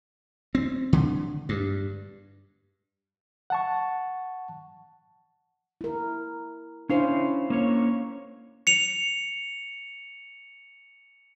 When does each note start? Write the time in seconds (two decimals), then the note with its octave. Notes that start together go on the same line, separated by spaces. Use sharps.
0.55 C4
0.93 D3
1.49 G2
3.50 F#5 A5 C#6
5.81 E4 A#4
6.90 C#4 D4 E4 C5 F5
7.50 A#3 C#4 C#5
8.67 C#7 F7